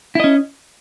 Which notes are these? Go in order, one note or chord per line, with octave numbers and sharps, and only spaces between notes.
C#4 E4 D#5